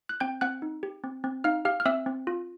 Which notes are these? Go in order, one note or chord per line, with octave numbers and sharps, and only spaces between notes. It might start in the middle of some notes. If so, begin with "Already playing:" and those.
F#6
C4 G5 G6
C4 F#5 F#6
D#4
G4
C4
C4
D#4 F5 F6
G4 F5 F6
F6
C4 E5 E6
C4
F4